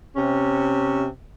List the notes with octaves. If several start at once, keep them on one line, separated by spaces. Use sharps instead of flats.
C3 C#4